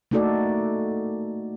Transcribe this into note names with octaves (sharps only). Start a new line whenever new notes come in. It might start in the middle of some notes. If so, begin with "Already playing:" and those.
A3 A#3 D#4 F#4 A4 D5